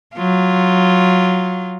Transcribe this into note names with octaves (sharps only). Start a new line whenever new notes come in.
F#3 F4